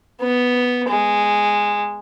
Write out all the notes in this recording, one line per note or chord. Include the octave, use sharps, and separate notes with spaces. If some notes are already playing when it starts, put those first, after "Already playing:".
B3
G#3